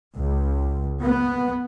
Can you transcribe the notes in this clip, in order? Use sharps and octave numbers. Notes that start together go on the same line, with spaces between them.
C#2
B3